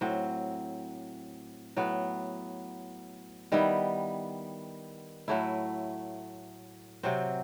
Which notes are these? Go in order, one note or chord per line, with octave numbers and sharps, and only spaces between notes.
A2 F#3 C4
A2 F#3 B3
D#3 G3 B3 E4
A2 F#3 A3 E4
C3 F#3 C4